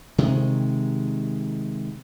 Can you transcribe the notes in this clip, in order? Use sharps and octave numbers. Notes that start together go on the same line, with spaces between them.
C3 D#3 G#3